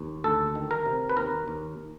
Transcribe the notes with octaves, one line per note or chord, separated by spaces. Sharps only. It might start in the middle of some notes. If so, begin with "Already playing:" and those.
Already playing: D#2
D2 A4
D#3
A#4
C3
B4
D#2 A#4
D#2